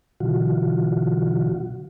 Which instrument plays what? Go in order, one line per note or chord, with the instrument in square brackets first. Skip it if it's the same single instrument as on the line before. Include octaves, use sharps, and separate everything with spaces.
[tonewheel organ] B2 D3 E3 F#3 F4 F#4